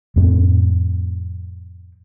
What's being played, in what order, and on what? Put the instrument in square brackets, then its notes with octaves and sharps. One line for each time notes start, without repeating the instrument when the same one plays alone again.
[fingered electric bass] F2 A2 C4